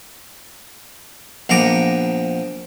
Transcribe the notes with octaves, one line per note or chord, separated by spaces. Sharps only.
A#1 F3 B3 A#5 D6